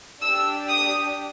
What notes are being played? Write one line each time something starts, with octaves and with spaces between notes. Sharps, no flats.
D4 G4 E6
D#6